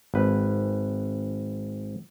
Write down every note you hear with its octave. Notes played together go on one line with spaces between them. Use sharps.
G#1 B4